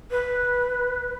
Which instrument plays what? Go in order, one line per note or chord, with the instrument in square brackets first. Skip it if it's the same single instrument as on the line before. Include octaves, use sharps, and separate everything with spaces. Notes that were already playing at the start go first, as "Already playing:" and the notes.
[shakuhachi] B4